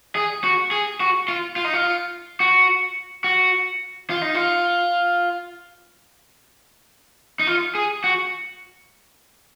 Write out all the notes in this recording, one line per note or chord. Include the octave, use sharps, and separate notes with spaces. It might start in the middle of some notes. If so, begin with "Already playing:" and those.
G#4
F#4
G#4
F#4
F4
F4
D#4
F4
F#4
F#4
F4
D#4
F4
D#4
F4
G#4
F#4